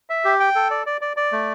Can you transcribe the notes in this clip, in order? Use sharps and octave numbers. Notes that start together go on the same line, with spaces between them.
E5
G4
G5
A4
D5
D5
D5
D5
A3